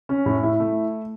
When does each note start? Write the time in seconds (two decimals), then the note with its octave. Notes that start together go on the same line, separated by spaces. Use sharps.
0.09 C#4
0.26 A2
0.43 E4
0.60 A3